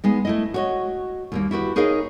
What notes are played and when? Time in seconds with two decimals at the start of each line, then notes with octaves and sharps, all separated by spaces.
0.04 G#3 B3 D#4
0.25 A3 E4 D#5
0.54 F#4 C#5 D#5
1.32 D#2 G3 A#3
1.51 E4 F#4 G4 B4
1.76 D#4 G#4 A#4 C#5 D#5 F5